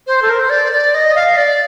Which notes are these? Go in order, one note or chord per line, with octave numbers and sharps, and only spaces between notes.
C5
A4
A#4
C5
D5
D5
D#5
F5
D5